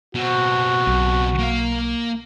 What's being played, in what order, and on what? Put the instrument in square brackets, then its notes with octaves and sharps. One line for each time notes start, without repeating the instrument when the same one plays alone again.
[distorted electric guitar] B2 C4 [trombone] F#4
[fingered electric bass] B1
[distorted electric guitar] A#3 F5